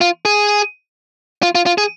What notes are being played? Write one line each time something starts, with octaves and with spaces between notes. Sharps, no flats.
F4
G#4
F4
F4
F4
G#4